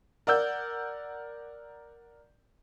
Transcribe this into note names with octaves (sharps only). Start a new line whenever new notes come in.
A#4 D5 F#5 E6 G6